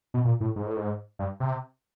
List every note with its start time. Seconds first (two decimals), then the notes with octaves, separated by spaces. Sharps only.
0.14 B2
0.25 A#2
0.40 A2
0.56 G#2
0.66 A2
0.77 G#2
1.19 G2
1.40 C3